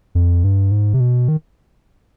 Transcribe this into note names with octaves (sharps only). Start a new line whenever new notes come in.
F2
G2
G#2
C3
B2
D#3